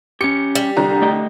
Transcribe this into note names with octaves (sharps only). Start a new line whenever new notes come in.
C#4 G4 C#7
G3
C2 D3 A#5
A3 D#5 G5